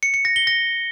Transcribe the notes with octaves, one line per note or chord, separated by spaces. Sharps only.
C#7
C#7
A#6
G7
A#6